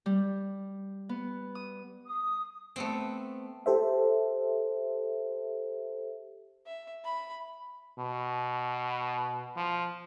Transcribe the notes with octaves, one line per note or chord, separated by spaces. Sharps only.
G3
B3
D#6
D#6
A3 B3 C4
G4 A4 C5 E5
E5
B5
B2
F3